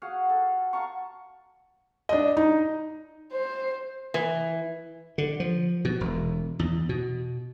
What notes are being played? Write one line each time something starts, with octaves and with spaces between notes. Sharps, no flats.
F#4 G#4 F5 F#5
A4
F5 A5 A#5 C#6
D4 D#5
D#4
C5
E3
D3
F3
B2
E1
E2
B2